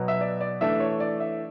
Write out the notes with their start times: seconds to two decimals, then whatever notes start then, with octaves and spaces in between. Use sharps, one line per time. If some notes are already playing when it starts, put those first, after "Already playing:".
Already playing: B2 F#3 B3
0.08 E5
0.21 D5
0.41 D5
0.61 E3 A3 D4 E5
0.80 C#5
1.00 D5
1.20 E5